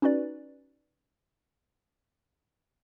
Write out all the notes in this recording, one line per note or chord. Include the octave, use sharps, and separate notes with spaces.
C#4 D#4 F#4 B4 D5